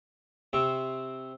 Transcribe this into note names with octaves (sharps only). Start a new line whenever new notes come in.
C3 C4 C#6